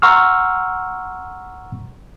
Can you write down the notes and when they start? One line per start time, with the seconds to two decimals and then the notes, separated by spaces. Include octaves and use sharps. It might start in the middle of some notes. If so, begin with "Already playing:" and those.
0.02 F#5 A#5 C6 C#6 E6 F6